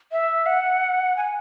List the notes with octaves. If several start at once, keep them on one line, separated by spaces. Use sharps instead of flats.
E5
F#5
G#5